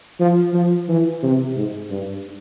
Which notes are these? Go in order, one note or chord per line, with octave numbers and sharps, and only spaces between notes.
F3
F3
E3
C3
G#2
G2